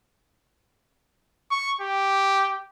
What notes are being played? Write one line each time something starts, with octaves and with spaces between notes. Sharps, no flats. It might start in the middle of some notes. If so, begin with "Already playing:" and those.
C#6
G4